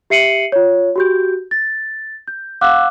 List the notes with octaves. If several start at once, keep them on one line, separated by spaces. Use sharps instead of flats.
G4 E5 C7 C#7 D#7 F#7
F4 C#5
F#4 G4 G6
A6
G6
F5 F#5 D6 E6 F#6